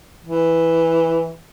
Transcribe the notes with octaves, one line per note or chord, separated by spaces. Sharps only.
E3